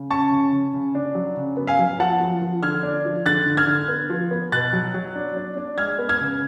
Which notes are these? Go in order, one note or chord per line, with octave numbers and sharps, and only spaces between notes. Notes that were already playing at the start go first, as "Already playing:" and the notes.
Already playing: C#3
C#4 A5 C#6
C#3
C#3
C#3
D4
F#3
C#3
B3
F5 G#5
F#3
F3 F#5 A5
F3
F3
D3 F6 G#6
D4
F3
D3 F#6 A6
D3
F6 G#6
D3
B3
F3
B3
B2 F#6 A6
F#3
F#3
D4
D4
D4
G#3 F6 G#6
B3
F6 G#6
C#3